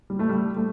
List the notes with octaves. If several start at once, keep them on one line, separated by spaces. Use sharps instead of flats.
G3
A3
G3
A3